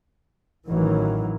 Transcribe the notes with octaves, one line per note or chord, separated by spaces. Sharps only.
A1 D#3 E3 F#3